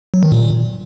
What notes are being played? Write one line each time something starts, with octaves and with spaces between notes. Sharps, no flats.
F#3
D#3
A#2